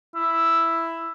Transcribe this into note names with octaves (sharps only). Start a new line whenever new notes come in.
E4